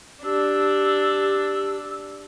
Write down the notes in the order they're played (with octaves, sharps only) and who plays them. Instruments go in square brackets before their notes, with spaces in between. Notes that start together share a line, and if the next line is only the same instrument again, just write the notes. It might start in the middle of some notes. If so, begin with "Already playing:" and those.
[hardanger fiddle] D4 [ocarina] G4 [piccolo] E6